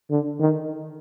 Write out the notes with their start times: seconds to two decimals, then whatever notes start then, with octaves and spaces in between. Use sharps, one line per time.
0.10 D3
0.40 D#3